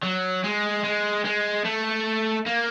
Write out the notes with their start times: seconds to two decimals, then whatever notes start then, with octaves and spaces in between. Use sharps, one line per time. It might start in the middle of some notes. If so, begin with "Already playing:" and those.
0.03 F#3
0.44 G#3
0.84 G#3
1.25 G#3
1.65 A3
2.46 A#3